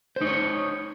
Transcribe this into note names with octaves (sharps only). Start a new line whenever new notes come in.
D#4 C5 C#5